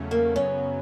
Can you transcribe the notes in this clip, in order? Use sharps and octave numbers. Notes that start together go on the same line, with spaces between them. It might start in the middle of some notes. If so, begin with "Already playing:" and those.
Already playing: E2 C#3 F#3 A3 C#4
A#3
F#2 C#3 F#3 B3 C#4